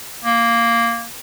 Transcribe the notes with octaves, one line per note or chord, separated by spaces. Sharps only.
A#3